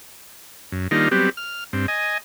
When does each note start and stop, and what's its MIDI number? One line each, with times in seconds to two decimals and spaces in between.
0.72 0.88 42
0.91 1.09 51
0.91 1.09 55
0.91 1.09 58
0.91 1.09 62
0.91 1.09 63
0.91 1.09 65
1.11 1.30 54
1.11 1.30 55
1.11 1.30 59
1.11 1.30 60
1.11 1.30 67
1.37 1.64 89
1.73 1.86 43
1.73 1.86 60
1.88 2.18 75
1.88 2.18 80